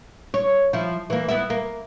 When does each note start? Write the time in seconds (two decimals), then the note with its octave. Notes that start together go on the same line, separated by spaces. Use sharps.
0.34 C#5
0.73 F3 E4
1.10 E3 A#3
1.28 B3 E4
1.50 A#3